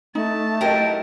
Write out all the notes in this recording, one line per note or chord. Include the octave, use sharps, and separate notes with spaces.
A3 D#4 A5
F#3 E4 G4 A#4 D#5